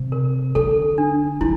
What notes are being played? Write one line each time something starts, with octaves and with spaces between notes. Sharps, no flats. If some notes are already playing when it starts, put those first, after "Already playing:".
Already playing: C3
A#4
D3 A4
D4
F3 E4